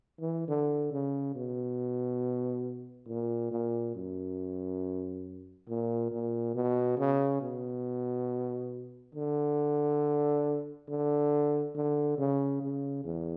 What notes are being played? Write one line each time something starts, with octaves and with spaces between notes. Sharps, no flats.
E3
D3
C#3
B2
A#2
A#2
F#2
A#2
A#2
B2
C#3
B2
D3
D3
D3
C#3
C#3
E2